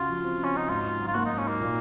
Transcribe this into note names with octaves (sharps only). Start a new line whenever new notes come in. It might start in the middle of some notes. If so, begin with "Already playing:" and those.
Already playing: C#3 F4 F#4
F3
C4
C#3
C#4
D#4 F#4
G#2 F4
D#4
F#3
F4
A#3 F#4
G#2 D#4
C#4
A#3 D#4
A#2